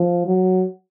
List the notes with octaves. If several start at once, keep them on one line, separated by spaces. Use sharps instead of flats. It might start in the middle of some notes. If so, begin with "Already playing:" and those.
Already playing: F3
F#3